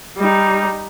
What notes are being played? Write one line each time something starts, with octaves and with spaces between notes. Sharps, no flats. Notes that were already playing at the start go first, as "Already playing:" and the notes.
G3 D#4